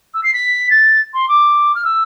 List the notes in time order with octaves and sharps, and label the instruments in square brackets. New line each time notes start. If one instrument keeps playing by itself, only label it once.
[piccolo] E6
C7
B6
A6
C6
D6
F6
E6